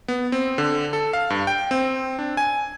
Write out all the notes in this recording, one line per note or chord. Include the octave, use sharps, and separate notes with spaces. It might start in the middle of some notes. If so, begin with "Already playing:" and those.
B3
C4
D3
A4
F5
G2
G5
C4
D4
G#5